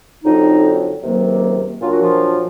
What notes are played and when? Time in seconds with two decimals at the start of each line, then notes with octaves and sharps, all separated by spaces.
0.24 F2 D3 F#3 D#4
1.02 C#2 C3 D#3 F#3 A#3
1.80 A#2 F#3 A#3 D4 F4
1.91 F#4
2.01 F3 F4